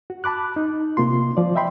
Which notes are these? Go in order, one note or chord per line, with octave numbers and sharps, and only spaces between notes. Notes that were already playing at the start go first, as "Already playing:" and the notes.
F#4
A5 B5 D6 F#6
D#4
C3 A#3 F4 C6
F3 D5
D#5 E5 G5 B5 C6